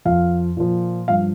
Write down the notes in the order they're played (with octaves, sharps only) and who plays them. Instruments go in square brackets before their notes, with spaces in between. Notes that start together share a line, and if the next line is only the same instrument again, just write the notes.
[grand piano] F2 F3 F5
A#2 F3
G2 F3 F5